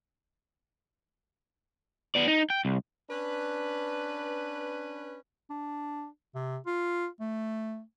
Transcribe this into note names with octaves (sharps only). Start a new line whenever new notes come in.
B3 D5
D#4
G5
C2
C#4 D4 B4
D4
C3
F4
A3